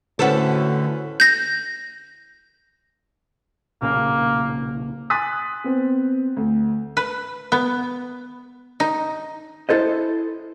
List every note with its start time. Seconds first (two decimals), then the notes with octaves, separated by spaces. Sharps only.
0.19 A2 D3 C#4 F#4 A4 B4 C5
1.20 G6 A#6
3.82 B1 A#2 C#3 A#3
5.10 G#5 C6 D#6 F#6 A6 B6
5.64 B3 C4
6.36 D2
6.97 B4
7.52 B3
8.80 D#4
9.69 E4 A4 C5 D#5